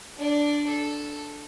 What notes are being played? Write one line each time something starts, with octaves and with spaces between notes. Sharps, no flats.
D4 D5
A4